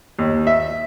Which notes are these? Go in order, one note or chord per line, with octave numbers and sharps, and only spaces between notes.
D#2
E5